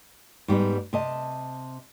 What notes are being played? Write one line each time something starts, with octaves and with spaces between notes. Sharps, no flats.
G#2 G3 B3 D#4
C3 D#5 A5